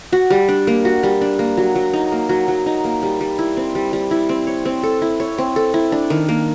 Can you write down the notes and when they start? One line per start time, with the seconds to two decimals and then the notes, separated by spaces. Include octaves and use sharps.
0.12 F#4
0.30 G3
0.48 D4
0.67 A#3
0.85 F#4
1.03 G3
1.21 D4
1.39 A#3
1.57 F#3
1.75 F#3
1.93 D#4
2.12 A#3
2.29 F#3
2.48 F#3
2.66 D#4
2.84 A#3
3.03 G3
3.21 G3
3.39 E4
3.57 C4
3.75 G3
3.93 G3
4.11 E4
4.29 C4
4.47 C#5
4.65 C4
4.83 A4
5.02 E4
5.20 C#5
5.38 C4
5.56 A4
5.74 E4
5.92 D4
6.10 D#3
6.29 A#3